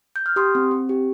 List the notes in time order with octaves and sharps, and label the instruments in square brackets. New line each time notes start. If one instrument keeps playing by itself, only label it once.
[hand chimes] G6
F6
G4 C6 D#6
C4
C4
G4